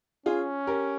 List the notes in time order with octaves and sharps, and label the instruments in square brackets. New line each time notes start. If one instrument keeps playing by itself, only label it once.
[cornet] C#4 [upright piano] F4 G#4
[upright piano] G4 A#4